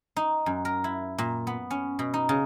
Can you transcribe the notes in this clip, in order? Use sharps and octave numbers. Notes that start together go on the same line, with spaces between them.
D#4
F#2
A#4
E4
A#2
B3
C#4
B2
D#4
C#3